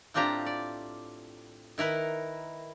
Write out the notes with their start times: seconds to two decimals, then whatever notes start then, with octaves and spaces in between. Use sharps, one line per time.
0.14 A2 C4 D4 F4 G4 A#5
0.46 D5
1.78 D#3 E4 A#4 B4